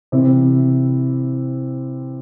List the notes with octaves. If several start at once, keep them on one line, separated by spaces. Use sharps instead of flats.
C3 E3 C4 E4